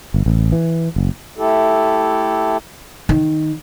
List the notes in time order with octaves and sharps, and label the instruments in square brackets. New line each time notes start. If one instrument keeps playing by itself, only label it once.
[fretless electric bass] G1
A1
E3
F#1
[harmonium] A3 E4 G4 A4
[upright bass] D#3